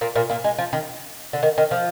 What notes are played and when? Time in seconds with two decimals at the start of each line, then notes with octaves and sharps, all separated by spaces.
0.01 A#2 A#3
0.15 A#2 A#3
0.29 A#2 A#3
0.44 G#3
0.58 F3
0.73 D#3
1.33 D3
1.43 D#3
1.58 D#3
1.71 F3